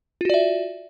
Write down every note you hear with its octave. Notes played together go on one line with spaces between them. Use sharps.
F4 F#4 D5 E5